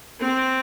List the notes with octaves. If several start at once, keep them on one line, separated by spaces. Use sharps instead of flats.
C4